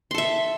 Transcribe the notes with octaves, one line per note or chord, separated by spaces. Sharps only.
A4 E5 C6